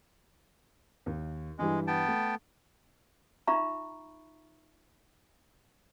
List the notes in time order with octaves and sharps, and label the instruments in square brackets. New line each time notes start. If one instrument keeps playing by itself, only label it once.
[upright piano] D#2
[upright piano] G2 E3 G3 [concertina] G#3
[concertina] B3 G5 A5
[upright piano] A3
[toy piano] D#4 F4 E5 A#5 B5 C#6